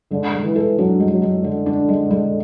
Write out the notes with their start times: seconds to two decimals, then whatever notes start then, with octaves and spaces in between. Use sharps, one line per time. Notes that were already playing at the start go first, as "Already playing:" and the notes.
0.11 D3 G#3
0.33 G#3
0.44 E3
0.56 A4
0.78 F#3 D4
1.00 G#3
1.11 F#3
1.22 G#3
1.44 D3 A4
1.66 D4
1.89 G#3
2.11 G#3